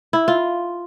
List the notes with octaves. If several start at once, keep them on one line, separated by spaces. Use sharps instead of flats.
E4
F4